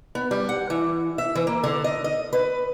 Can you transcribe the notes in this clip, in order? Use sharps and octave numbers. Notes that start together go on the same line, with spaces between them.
B3
G3
F#5
E3
E5
E3
A#3
D3
D#5
D#5
B4